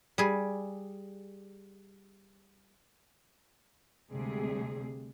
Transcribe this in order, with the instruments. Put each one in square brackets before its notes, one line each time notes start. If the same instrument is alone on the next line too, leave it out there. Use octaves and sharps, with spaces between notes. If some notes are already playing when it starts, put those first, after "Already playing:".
[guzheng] G3 G#4
[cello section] D2 C3 G3 G#3 G#4